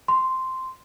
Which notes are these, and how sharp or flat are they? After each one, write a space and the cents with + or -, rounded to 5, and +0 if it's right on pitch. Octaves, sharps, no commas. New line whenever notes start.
C6 -5